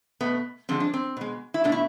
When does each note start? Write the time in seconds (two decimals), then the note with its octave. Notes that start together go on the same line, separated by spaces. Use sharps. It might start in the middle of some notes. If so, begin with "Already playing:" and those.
0.20 B2 A3 B3
0.69 D3 F3 G#3 C4
0.80 D4
0.94 C4
1.17 B2 G#3
1.54 E4
1.64 B2 A3 D4
1.72 E4